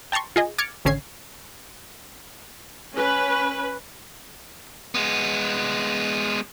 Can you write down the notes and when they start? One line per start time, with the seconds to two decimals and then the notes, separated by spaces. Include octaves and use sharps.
0.12 G5 A5 A#5 C6 C#6
0.36 F4 G#4 D#5
0.58 D6 F6 G#6 A6 C#7
0.85 A1 D3 C#4 G#6 C7
2.92 C#4 B4
4.95 G#3 B3